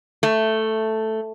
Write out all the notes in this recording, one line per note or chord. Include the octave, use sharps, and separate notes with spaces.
A3